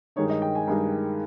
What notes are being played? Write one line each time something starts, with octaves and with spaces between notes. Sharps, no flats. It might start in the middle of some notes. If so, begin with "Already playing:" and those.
G2 D#3 G#3 D#4 C#5
D#5
G5
G#5
G2 D#3 G#3 D#4